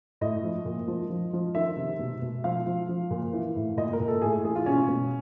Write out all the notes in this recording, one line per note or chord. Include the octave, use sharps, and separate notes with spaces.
A2 D#5
F3
A#2
F3
F3
F3
D#3 E5
C3
B2
B2
F3 F5
F3
F3
A#2
E3
A2
A#2 D#5
A#4
A#2
A4
A2 G#4
E3 G#4
F4
B2 C#4
B2